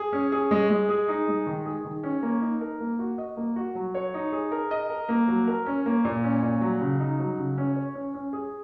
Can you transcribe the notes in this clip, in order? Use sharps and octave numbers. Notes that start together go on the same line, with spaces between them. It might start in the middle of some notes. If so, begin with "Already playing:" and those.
Already playing: G#4
C#4
G#4
G#3
G#3
G#4
D#4
G#3
D#3
G#4
D#3
C#4
A#3
D#4
A#4
A#3
F#4
D#5
A#3
F#4
F#3
C#5
D#4
G#4
A#4
D#5
A#4
A#3
F#3
A#4
C#4
A#3
A#2
C#4
A#2
F#3
C#3
D#4
F#3
C#3
C#4
C#5
C#4
C#4
G#4